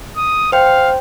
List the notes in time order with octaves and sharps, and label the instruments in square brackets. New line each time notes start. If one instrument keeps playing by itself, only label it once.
[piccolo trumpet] D#6
[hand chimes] C5 G5 [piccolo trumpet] F5